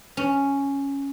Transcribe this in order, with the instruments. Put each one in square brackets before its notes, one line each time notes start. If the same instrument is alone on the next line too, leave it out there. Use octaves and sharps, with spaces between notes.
[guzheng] C#4